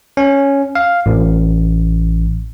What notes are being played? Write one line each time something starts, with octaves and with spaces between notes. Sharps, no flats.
C#4
F5
A1